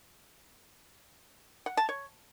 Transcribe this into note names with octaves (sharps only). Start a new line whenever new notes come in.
F#5
A5
C#5